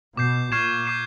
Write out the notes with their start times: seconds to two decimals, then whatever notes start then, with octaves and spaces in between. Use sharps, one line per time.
0.17 B2 D6 G6 C7
0.52 A#2 C#6 F6 G#6 C7 E7
0.85 D6 G6 C7 E7